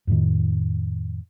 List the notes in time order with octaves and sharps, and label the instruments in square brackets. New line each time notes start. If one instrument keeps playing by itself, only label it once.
[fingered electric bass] F2 A2 D#3